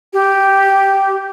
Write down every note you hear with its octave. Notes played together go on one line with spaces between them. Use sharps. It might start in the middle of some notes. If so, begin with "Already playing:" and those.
G4